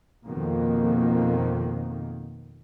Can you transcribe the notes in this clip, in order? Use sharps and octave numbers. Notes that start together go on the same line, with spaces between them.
F2 B2 D#3 A#3